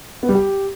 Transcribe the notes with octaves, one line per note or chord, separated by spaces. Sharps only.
B3
G3
G4